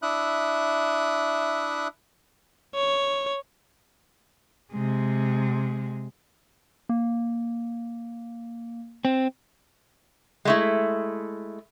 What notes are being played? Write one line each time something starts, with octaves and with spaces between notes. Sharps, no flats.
D4 E4 E5 D#6 F#6
C#5
C3 G#3
A#3
C4
G#3 A3 E4